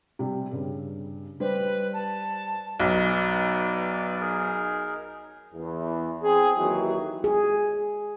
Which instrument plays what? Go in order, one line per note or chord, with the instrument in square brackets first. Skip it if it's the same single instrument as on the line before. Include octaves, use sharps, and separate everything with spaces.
[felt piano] C3 G3
G2 C#3
[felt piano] G3 G4 C5 [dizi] B4
[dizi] A5
[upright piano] B1 [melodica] D#4 B4 D5
[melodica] D#4 G#4 A#4
[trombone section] E2
C4 G#4
D#2 E3 F#3
[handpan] G#4